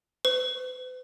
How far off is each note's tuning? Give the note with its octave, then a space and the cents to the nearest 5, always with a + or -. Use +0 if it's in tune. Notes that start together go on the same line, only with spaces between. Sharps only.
B4 +45